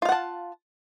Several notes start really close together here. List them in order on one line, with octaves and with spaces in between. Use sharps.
F4 F5 F#5 A5